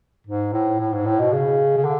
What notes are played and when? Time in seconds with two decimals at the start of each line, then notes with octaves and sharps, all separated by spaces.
0.27 G#2
0.53 A2
0.79 A2
0.93 G#2
1.06 A2
1.19 B2
1.32 C#3
1.77 C#3
1.85 D3